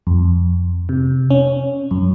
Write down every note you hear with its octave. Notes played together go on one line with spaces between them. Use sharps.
F2
C3
C#4
F#2